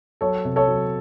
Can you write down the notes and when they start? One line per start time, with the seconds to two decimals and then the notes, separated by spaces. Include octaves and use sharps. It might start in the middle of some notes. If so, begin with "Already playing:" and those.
0.21 F#3 A4 C#5
0.45 C3
0.56 A4 C#5
0.68 F#3